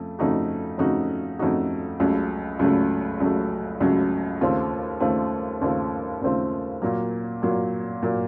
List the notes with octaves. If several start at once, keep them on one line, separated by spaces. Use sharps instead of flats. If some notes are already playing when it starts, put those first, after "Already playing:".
Already playing: F2 C#3 A3
F2 C#3 A3 D#4 F#4
F2 C#3 A3 D#4 F#4
F2 C#3 A3 D#4 F#4
C#2 C#3 F#3 A3
C#2 C#3 F#3 A3
C#2 C#3 F#3 A3
C#2 C#3 F#3 A3
D#2 C#3 A3 C4 F4
D#2 C#3 A3 C4 F4
D#2 C#3 A3 C4 F4
D#2 C#3 A3 C4 F4
A#2 F#3 A#3
A#2 F#3 A#3
A#2 F#3 A#3